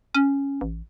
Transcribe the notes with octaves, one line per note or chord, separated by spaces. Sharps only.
C#4
A1